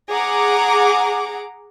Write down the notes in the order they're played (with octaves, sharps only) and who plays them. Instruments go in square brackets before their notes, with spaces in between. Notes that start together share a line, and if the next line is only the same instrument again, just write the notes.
[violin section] G#4 F#5 A#5 D6